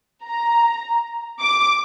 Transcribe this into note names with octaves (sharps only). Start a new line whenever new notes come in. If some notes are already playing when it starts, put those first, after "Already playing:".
A#5
D6